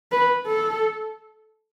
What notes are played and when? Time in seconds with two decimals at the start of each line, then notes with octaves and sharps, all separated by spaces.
0.12 B4
0.46 A4